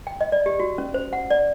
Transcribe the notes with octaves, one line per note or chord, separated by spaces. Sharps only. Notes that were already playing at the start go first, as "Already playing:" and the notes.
G5
D#5
D5
G4
F#4
C#4
C5
F#5
D5